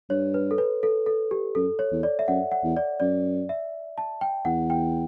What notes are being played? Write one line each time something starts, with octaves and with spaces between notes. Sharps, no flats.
G2 C#5
B4
A4
B4
A4
A4
G4
F#2 A4
C#5
E2
D5
E5
F#2 F#5
F#5
E2
D5
F#2 D5
E5
A5
G5
E2 F#5
G5